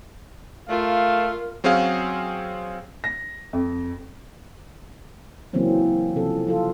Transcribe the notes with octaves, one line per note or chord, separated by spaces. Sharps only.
A3 F4 A#4 F5
F#3 C4 C#4 G#4 F5
A#6
F2
C#3 E3 F#3 A#3 C4 C#4
C3 F3 A4
F3 F4 A4